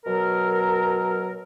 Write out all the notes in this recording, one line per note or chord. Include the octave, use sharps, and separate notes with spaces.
B2 F#3 A#4